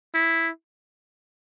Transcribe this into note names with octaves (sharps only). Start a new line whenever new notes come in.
E4